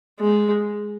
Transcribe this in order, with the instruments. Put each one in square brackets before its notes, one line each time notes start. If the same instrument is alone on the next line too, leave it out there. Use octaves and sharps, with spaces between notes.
[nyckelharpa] G#3